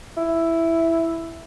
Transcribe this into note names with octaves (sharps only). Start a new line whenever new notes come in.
E4